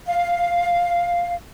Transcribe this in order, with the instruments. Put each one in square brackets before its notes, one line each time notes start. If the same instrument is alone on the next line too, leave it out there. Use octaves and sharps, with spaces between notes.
[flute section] F5